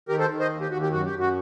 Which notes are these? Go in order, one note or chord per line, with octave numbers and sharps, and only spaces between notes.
D#3 G4 A#4
A4 C5
D#3
C5 D#5
D#2
G4
D#2 F#4
G4
F#2 F#4
G4
F#2
F#4